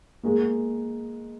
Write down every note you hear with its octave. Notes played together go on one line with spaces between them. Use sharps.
G#3 A#3